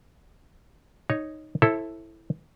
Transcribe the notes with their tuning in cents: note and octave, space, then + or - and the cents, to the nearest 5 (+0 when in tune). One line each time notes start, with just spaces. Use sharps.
D#4 +0 C#5 +0
E4 +0 A4 +0 C5 +35